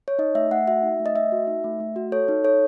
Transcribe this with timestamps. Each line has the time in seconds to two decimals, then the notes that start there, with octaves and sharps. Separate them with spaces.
0.08 C#5
0.19 D#4 D#5
0.35 A3 E5
0.51 A3 F#5
0.67 F#4 E5
0.83 D#4
1.00 A3
1.06 D#5
1.15 A3 E5
1.32 F#4
1.47 D#4
1.64 A3
1.80 A3
1.96 F#4
2.12 A4 C#5
2.28 D#4
2.44 A4 C#5